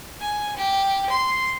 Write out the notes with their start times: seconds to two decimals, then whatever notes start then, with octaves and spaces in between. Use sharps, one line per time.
0.20 G#5
0.56 G4
1.10 C6